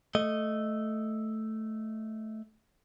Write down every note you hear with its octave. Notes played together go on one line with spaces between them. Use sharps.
A3 D#5